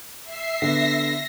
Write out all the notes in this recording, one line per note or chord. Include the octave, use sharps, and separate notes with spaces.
E5 C7
D3 B3 A#6